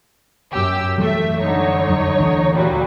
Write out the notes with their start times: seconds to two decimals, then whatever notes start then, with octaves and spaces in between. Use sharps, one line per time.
0.51 F#2 G4 E6
0.98 F#2 E3 G3 A3 E5
1.40 D3 D#4 C#5
1.89 F2 F#3 D4
2.19 D2 E3
2.54 A#2 F#3 G3